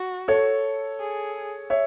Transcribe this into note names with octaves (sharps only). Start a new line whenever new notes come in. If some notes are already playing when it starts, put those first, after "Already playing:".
Already playing: F#4
A4 C#5
G#4
C#5 E5